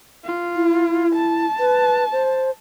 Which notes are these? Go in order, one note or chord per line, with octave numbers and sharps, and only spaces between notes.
F4
E4
A5
B4
C5